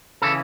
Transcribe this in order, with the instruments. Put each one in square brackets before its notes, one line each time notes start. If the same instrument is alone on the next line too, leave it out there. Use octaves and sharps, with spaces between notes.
[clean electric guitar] C#3 E3 A4